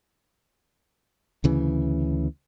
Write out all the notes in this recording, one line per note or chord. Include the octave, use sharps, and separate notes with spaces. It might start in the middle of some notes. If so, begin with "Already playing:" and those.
D2 C#3 E3